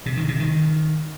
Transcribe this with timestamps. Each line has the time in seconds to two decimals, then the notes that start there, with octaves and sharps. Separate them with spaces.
0.06 C3
0.17 D#3
0.28 C3
0.40 D#3